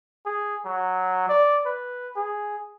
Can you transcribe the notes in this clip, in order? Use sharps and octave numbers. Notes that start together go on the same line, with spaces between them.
G#4
F#3
D5
B4
G#4